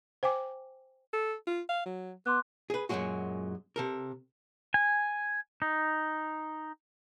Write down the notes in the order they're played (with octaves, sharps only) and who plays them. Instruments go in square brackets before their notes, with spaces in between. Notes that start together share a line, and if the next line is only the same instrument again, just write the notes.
[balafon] C5 G5 G#5 D6
[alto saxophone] A4
F4
F5
F#3
[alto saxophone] B3 [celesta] C6 D6 F#6
[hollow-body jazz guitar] G#4 B4
F#2 A#2 E3 F#3 G#3 F#4
C3 A4 A#4
[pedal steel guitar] G#5
D#4